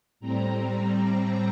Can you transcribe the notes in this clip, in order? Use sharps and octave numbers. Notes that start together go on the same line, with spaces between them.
A2 G3 C4 A#5